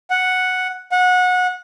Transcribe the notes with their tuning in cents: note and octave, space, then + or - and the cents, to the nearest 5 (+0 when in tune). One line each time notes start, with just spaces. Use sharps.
F#5 -5
F#5 -25